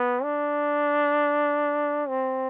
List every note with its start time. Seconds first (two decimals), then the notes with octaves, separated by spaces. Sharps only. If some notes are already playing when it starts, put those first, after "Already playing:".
Already playing: B3
0.23 D4
2.08 C4